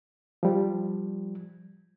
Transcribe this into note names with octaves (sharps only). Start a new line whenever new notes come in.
F3 G3